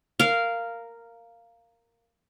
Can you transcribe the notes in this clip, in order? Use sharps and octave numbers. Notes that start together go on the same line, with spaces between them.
A#4 F5